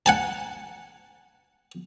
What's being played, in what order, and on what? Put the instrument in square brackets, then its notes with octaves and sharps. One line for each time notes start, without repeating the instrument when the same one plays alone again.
[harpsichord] F#5 G#5 A5